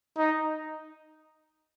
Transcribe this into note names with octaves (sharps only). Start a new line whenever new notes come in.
D#4